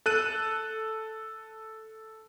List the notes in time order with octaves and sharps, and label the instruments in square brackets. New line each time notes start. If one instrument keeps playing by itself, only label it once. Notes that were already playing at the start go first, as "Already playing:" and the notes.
[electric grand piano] A4 F#6 D#7